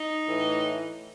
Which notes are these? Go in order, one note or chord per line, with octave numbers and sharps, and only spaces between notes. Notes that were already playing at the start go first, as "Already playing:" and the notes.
Already playing: D#4
A2 E3